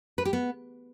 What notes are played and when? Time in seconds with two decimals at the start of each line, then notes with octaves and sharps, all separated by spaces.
0.18 B4
0.25 G4
0.33 B3